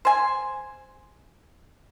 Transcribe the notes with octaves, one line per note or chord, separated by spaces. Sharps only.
C5 G#5